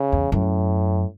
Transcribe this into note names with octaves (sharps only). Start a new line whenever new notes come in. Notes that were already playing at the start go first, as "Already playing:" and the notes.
Already playing: C#3
E2
F#2 A2